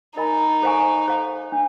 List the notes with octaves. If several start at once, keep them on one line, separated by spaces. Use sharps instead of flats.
D#4 A#4 D#5 G#5 B5
A4 C5 F5 G#5 C#6
A4 C5 F5
D4